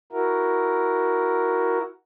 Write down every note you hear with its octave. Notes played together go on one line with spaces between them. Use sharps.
E4 F#4 A#4